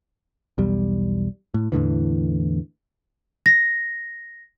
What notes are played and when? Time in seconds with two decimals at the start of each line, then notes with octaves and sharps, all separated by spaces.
0.58 B1 E2 G3
1.54 A2
1.72 E2 A2 D3 E3
3.46 A#6